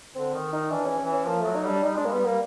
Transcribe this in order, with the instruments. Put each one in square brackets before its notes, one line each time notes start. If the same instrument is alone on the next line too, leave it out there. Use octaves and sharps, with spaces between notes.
[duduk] D3 [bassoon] C4
[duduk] D#3
[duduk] D#3 [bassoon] D#4
[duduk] E3 [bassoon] D4
[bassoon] C#4
[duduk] E3 [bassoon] C#4
[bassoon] C#4
[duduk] F3 [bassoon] A#3
[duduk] F#3 [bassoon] A3
[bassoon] D#4
[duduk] G3 [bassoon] D4
[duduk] G3 [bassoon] D#4
[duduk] G#3 [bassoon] D4
[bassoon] A#3
[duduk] G3 [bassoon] B3
[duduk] G3 [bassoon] A#3